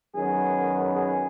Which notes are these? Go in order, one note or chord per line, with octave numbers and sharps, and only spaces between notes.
F#2 D#3 F#3 B3 G#4
G#4